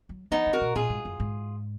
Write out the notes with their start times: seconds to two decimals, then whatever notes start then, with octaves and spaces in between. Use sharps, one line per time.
0.09 F#3
0.31 F3 B3 D#4
0.46 D#3
0.53 F#4 A#4
0.61 B2
0.75 A#2 F4 G#4
0.90 G#2
1.05 F#2
1.20 G#2